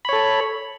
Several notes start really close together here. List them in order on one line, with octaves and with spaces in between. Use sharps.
B5 C#5 A4